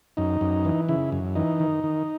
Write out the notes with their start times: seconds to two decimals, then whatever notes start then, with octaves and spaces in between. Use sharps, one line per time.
0.17 F#2 D#4
0.41 F#2
0.65 E3
0.89 C#3 E4
1.12 F#2
1.36 E3 D#4
1.60 D#3
1.84 D#3